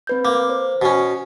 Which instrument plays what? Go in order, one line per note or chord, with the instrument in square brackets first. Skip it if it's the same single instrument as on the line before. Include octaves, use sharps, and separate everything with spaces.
[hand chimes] C4 B4 G6
[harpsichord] A#3 [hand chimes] D6
[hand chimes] C5
[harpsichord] B2 C#4